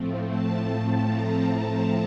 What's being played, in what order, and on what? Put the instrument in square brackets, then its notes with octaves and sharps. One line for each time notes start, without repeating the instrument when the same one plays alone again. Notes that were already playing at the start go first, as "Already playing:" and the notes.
Already playing: [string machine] A2 F3 A3 C4
A5
A#5